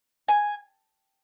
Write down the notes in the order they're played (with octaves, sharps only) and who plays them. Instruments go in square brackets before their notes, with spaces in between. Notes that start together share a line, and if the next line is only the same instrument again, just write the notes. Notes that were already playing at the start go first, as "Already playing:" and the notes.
[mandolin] G#5